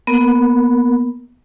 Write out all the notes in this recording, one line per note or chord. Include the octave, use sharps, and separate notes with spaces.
A#3 B3 A#4